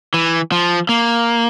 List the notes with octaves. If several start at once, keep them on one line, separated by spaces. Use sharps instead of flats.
E3
F3
A#3